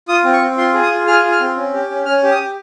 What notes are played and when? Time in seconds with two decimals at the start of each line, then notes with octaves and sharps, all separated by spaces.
0.09 F4 D#6
0.24 C4
0.33 C#6
0.41 C4
0.57 F4 C6
0.74 G#4
0.82 D#6
0.91 F4
1.07 G#4 F6
1.24 F4
1.32 F6
1.40 C4
1.56 C#4
1.74 G4
1.90 C#4
2.06 C#4 F6
2.23 G4
2.31 D#6
2.39 G4